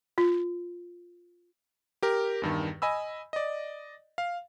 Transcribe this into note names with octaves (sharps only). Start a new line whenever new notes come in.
F4
G4 A#4
E2 G2 D#3
D#5 G#5 B5 E6
D5 D#5
F5